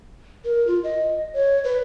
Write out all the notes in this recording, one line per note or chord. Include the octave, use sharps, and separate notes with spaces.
A#4
F4
D#5
C#5
B4